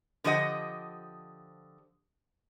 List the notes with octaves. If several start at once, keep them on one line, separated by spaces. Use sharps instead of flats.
D3 F3 G4 D#5 F#5